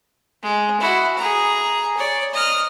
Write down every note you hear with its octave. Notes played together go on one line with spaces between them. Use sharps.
G#3
E4 F#4
G#4 A#5
C#5 D5
D#5 F6